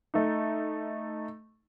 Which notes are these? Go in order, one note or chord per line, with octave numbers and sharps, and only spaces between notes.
A3 D#4